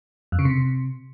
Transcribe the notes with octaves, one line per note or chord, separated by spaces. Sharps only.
F2
C#3
C3